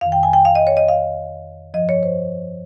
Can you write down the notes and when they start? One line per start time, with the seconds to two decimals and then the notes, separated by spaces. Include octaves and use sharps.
0.01 F2 D#3 F5
0.12 G5
0.23 G#5
0.33 G5
0.45 F5
0.55 D#5
0.67 C#5
0.77 D#5
0.88 F5
1.74 G2 F3 D#5
1.89 C#5
2.03 C5